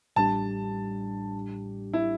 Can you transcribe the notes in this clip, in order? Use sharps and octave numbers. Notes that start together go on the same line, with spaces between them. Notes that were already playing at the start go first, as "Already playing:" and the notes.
A1 A2 G3 D4 G4 A5
E4